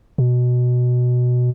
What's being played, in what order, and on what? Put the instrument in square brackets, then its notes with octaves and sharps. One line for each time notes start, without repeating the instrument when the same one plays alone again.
[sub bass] B2